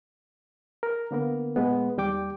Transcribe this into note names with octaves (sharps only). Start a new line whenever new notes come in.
A#4
D3 A#3 B3 A#4
A#2 G#3 B3
D#2 G3 G5 D6